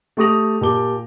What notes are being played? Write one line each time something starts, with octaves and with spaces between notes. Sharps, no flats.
A3 G4 C#6 D#6 A#6 F7
A#2 G4 A5 D6 G7